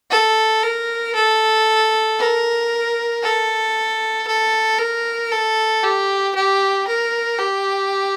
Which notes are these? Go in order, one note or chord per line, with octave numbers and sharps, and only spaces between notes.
A4
A#4
A4
A#4
A4
A4
A#4
A4
G4
G4
A#4
G4